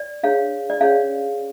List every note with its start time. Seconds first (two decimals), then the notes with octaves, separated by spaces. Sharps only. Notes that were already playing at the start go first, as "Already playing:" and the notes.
Already playing: D5
0.23 D4 G#4 C#5 F5
0.70 D5
0.81 C#4 G#4 C#5 F5